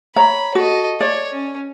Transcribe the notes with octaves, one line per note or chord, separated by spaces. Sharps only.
C#5 A#5 B5
F#4 A4 D#5
C#5 D5
C#4